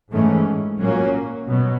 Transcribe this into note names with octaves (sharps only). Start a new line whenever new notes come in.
G#2 E3 A3 C#4
A#2 F#3 A#3 C#4
B2 F#3